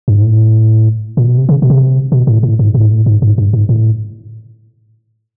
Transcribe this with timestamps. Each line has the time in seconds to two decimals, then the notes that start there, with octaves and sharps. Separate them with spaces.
0.08 G2
0.15 G#2
0.22 A2
1.17 A#2
1.27 B2
1.38 C3
1.49 C#3
1.62 B2
1.70 C3
2.12 B2
2.27 A2
2.43 A2
2.59 G#2
2.74 A2
2.84 G#2
2.90 A2
3.06 G#2
3.22 G#2
3.38 G2
3.53 G#2
3.69 A2